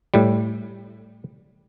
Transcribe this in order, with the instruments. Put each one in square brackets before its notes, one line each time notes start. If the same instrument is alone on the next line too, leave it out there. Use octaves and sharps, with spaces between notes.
[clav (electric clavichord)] A2 G3